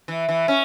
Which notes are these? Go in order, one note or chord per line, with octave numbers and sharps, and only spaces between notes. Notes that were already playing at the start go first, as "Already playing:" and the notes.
E3
E3
C#4